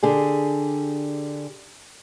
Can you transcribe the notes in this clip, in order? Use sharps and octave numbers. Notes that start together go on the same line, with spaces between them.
D3 G4 G#4